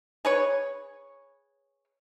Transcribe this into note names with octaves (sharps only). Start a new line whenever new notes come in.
G#4 B4 C#5